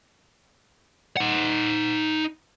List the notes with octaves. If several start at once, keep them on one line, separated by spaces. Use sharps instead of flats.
D#4 F#5